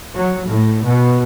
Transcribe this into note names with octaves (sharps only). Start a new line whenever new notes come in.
F#3
A2
B2